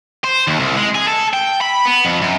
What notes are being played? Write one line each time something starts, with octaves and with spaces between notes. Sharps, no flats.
C5
D#2
C2
G#3
G#4
A4
G5
B5
B3
F2
F#2